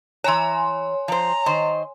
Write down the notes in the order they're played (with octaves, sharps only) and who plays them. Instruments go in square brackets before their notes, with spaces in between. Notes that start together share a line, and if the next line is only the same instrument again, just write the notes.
[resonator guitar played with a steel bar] E3 A#5 [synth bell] C#5 G#5 C6
[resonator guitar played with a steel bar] F3 C5 [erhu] A#5
[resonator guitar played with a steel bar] D#3 C5 D#5